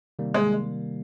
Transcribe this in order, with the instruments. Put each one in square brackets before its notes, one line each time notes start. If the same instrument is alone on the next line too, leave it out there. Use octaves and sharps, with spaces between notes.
[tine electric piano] C3 D#3 G3 A#3
[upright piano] G#3